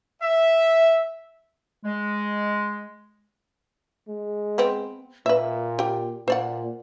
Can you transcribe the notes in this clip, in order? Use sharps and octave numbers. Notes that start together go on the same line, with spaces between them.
E5
G#3
G#3
B3 C4
A#2 B4 E5
G4 G5
A#2 C5 D5 F#5